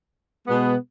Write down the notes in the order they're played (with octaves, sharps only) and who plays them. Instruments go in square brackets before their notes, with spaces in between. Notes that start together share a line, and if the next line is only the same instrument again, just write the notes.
[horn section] B2 G#3 B3